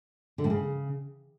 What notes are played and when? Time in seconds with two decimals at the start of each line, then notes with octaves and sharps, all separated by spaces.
0.38 D3
0.44 A2
0.50 C#3